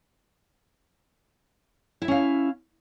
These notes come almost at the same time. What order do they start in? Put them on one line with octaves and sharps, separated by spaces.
E4 E5 C#4 F5